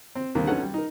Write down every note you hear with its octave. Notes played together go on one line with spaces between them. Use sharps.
C4
D#2 D3 G3 A#3 C4 D4
B1 C#4 D#4 A4 B4 F#5
G3
D#4 A#4